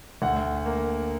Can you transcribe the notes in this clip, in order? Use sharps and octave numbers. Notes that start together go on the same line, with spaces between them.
D2 F#5
A#3